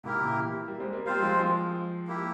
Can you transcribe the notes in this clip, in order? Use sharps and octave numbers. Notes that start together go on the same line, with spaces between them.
G#2 C3 A#3 E4 G4 A#4
A#2 C#3
C3 E3
G3 A#3
G#3 C4
G3 A#3
G3 A#3 C4 F4 C5 F5
G3
F3 G#3
F3 G#3
A#3 E4 G4